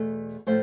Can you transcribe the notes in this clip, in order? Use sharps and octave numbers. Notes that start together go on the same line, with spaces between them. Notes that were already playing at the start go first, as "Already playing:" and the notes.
Already playing: E2 B2 A3
A2 F3 A3 C5